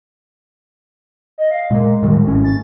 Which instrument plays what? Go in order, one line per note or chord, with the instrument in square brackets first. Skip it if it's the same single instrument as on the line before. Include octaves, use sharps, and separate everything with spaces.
[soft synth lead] D#5
F5
[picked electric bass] A#2 A#3 [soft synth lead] G#3
[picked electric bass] A2 D#3 G3
G#1 C#4
[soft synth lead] A6